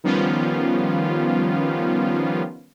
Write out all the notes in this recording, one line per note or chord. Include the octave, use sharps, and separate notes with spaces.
D#3 F3 G3 B3 C#4 F4